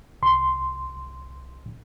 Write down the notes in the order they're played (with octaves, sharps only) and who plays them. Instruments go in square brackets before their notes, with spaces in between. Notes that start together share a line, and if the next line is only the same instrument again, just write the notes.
[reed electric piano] C2 C6